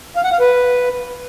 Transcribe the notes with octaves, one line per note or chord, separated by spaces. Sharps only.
F5
F#5
F5
B4